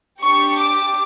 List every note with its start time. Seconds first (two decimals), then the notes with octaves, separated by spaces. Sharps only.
0.22 D4 G4 C#6
0.58 D6